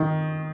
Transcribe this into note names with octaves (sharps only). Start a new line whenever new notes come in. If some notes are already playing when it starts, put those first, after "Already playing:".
Already playing: D#3